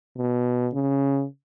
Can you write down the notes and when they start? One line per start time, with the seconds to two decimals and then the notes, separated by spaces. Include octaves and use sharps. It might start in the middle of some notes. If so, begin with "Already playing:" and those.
0.17 B2
0.74 C#3